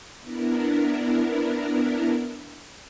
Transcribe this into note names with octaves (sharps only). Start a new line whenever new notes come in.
B3 D4 E4 A#4